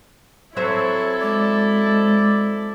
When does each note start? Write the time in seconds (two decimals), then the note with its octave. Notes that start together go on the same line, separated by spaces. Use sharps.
0.56 F#3 C4 E4 A4 C#5 E5
1.22 G#3 D5